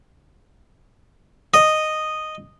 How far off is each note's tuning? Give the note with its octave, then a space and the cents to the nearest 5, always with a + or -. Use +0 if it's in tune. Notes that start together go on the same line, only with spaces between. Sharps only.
D#5 -5